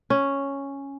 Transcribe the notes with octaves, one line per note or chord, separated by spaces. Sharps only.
C#4